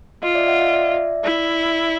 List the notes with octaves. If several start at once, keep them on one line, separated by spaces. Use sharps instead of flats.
F4 D#5 F5
D5 E5
E5 F#5
D#5 F5
D5 E5
E4